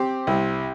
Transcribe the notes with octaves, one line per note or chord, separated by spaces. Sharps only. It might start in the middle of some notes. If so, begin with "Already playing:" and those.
Already playing: C4 G4 C5
C2